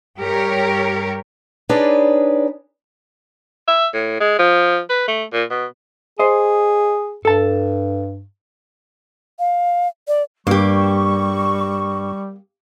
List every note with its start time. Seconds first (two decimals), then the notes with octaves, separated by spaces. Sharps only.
0.19 G2 G4 A#4 C#5
1.69 D4 D#4 G#4 B4 C#5 D5
3.68 E5
3.94 A2
4.20 G#3
4.39 F3
4.90 B4
5.08 A3
5.33 A#2
5.50 B2
6.19 G#4 C5 D#5
7.25 G2 A4 A5
9.39 F5
10.08 D5
10.47 G2 G3 A#3 G4 C#6